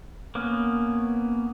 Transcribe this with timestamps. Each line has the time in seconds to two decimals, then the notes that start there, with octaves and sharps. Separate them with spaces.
0.35 A#3 B3 C#4